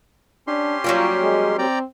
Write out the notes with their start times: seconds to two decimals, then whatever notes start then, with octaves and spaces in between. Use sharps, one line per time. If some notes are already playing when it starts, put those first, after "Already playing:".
0.47 C#4 D4 G4 C6
0.84 F#3 G3 A#3 F4
1.22 G#3
1.59 C4 D5 G5 A#5